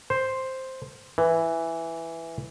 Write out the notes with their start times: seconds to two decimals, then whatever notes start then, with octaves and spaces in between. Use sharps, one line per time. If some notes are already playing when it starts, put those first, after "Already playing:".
0.10 C5
1.18 E3